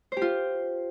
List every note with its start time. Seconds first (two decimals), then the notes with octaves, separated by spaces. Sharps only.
0.12 C5
0.17 G4
0.22 F4